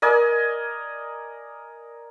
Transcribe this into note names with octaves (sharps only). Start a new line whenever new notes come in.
A#4 D5 D#5 G#5